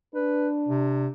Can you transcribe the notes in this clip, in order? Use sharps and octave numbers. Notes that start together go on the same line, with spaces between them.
D4 B4
C3